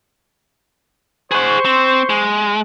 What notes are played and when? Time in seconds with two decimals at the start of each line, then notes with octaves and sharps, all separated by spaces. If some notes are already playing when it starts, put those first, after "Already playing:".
1.31 G#4 C5 F#5 C#6
1.65 C4
2.10 G#3